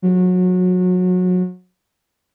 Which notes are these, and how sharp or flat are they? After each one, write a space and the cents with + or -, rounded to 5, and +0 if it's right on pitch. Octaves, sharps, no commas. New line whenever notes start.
F#3 -25